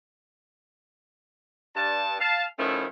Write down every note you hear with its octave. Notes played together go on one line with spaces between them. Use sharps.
G2 A5
F5 A5
D#3 F3 A3 C#4 E4